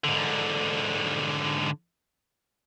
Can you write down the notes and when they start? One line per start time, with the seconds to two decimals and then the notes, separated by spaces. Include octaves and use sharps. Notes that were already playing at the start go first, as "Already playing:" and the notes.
0.04 G#2 D3